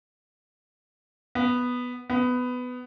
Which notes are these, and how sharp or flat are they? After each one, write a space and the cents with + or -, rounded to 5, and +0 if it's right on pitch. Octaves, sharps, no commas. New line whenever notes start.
B3 +0
B3 +15